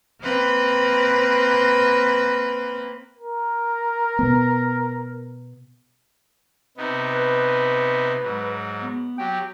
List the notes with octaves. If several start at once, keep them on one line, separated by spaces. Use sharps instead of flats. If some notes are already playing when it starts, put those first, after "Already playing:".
A#3 C4 B4
A#4
B2 B3
C3 B3 D#4
B4
G#2 F#3
B3
F#3 G4 G5